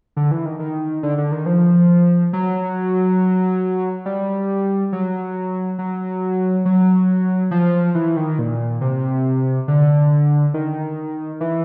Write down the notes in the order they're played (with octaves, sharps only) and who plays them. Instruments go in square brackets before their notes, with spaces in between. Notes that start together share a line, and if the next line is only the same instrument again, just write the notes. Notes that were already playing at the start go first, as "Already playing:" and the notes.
[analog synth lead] D3
E3
D#3
D#3
D3
D3
D#3
F3
F#3
G3
F#3
F#3
F#3
F3
E3
D#3
A#2
C3
D3
D#3
E3